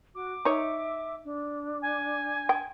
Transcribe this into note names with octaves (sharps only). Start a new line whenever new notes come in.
F#4 D6
D#4 C#5 E5
D4
G#5
G5